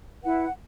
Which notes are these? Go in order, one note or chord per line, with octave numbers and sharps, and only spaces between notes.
E4 B4 F#5